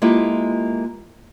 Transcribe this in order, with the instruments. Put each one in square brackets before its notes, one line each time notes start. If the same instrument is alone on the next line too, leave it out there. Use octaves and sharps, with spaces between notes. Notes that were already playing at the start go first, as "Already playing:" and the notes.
[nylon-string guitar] G#3 A#3 E4 F4 G4 A4